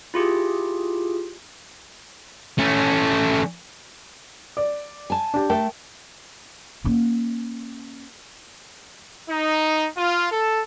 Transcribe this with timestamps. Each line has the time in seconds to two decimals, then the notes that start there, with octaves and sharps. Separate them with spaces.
0.14 E4 F4 G4 G#4
2.58 A3 C#4
4.57 D5
5.10 G#5 A5
5.34 D4 G4
5.50 A3 A#4 G5 A5
6.84 A#3 C#4
9.29 D#4
9.97 F4
10.31 A4